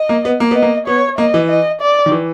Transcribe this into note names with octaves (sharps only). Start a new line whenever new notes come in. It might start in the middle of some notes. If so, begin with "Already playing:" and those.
Already playing: D#5
A#3
B3
A#3
B3 D#5
A#3
B3 C#5
A#3 D#5
E3
D#5
D5
D#3
E3